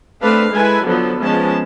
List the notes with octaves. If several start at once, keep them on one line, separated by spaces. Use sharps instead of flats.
A3 C4 D4 B4 F5
G#3 E4 A4 B4 G#5
D3 F3 F#3 B3 A4
F3 G#3 B3 C#4 A5